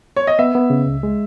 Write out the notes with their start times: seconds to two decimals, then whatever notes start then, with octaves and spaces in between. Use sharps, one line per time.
0.16 C#5
0.27 D#5
0.39 B3 E5
0.55 B3
0.70 C#3
0.87 C#2
1.03 G#3